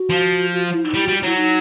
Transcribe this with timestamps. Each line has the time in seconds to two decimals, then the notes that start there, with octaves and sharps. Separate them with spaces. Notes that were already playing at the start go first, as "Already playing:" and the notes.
Already playing: F#4
0.10 F3
0.53 F#4
0.73 E4
0.84 D#4
0.94 G3 E4
1.05 G3 F#4
1.23 F#3 E4
1.37 D#4